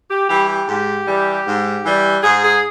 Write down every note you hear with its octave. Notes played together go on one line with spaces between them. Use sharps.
G4
E3 G3 G4
G4
G#2 G4
E3 G3
G#2
E3 G3
G#2 G#4
G#4